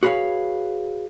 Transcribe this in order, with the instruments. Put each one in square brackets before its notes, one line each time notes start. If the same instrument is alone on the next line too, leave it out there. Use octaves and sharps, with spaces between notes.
[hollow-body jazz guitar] F#4 G#4 B4 C#5 F5